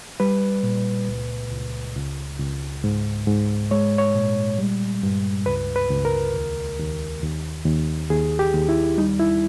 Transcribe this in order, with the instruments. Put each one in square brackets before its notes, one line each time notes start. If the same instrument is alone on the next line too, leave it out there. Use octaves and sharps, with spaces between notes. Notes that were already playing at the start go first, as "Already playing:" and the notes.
[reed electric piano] G3 B4
A#2
C#2
C#2
C#2
C#2
G#2
G#2
G#3 C#5
C#5
A#2
G3
G2
C#2 B4
B4
C#2
A#4
D#2
D#2
D#2
D#2
D#2 G#4
G4
D#2
E4
G3 D#4
E4